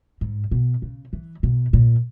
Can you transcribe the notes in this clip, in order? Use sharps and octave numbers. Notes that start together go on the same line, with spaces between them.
G#2
B2
C#3
E3
B2
A#2